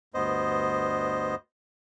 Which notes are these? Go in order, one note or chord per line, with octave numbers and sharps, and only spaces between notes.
D2 G2 B3 C5 D#5